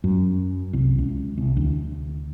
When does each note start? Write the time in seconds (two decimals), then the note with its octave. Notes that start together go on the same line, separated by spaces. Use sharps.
0.04 F#2
0.73 C2
0.98 C#2
1.38 C2
1.57 D2